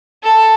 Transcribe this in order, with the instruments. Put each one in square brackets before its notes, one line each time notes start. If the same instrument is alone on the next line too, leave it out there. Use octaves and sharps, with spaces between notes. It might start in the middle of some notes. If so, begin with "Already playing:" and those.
[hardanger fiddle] A4